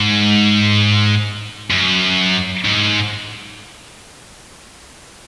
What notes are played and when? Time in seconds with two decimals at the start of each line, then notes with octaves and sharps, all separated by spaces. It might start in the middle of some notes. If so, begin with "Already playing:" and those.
Already playing: G#2
1.70 F#2
2.65 G#2